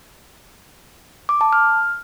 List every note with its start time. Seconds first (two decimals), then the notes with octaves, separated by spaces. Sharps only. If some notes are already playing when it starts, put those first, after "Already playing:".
1.29 D6
1.41 A5
1.53 F6